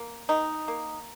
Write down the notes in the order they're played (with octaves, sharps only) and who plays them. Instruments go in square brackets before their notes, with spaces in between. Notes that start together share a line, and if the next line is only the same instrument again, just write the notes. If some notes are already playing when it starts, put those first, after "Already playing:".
Already playing: [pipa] A#3
D#3 D#4
A#3